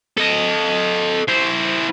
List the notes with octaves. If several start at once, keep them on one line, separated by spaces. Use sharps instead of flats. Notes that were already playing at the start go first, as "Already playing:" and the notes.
A4 D#5
E4 C5